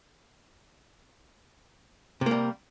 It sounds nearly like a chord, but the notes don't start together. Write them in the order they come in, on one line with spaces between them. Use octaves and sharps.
C3 A#3 G3